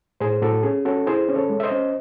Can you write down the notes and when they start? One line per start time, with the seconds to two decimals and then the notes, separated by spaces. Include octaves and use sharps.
0.21 A2 G#4 C5
0.42 A2 F#4 A4
0.63 C#4 G#4
0.85 C#4 F#4 A4
1.06 E4 G#4 C5
1.28 C#4
1.35 A4 C#5
1.50 G#3
1.60 E5
1.63 C5 D#5
1.71 C#4